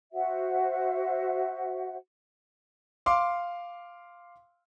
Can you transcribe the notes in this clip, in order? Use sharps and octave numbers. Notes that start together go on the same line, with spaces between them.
F#4 C5 E5 F#5
F5 C6 D6